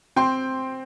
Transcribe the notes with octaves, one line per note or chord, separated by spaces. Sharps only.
C4 G5 C6